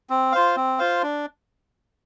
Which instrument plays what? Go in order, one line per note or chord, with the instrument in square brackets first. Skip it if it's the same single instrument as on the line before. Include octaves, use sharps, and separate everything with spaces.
[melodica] C4
F4 C5 F5
C4
F4 C5 F5
D4